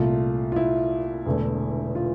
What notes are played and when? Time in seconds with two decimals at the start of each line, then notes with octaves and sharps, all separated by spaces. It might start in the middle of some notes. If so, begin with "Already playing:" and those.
Already playing: C2 A#2 A3 F4
0.52 F4
0.56 E4
1.25 E1 E2 D3 A3
1.95 F4